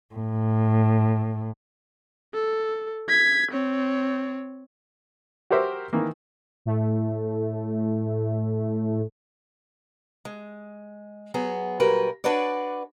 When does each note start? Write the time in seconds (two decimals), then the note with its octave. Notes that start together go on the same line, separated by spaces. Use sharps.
0.15 A2
2.34 A4
3.09 G#6 B6
3.52 C4 C#5
5.50 F#4 G4 A#4 C5 E5
5.93 D#3 E3 A#3
6.65 A2 A3
10.25 G#3
11.34 F#3 B3 G#4
11.80 A#2 F#3 G3 A#4 B4
12.24 D4 F#4 B4 C#5 D5